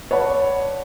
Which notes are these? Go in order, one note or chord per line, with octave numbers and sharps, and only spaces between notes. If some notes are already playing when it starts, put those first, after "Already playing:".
C#5 D5 F#5 A5 B5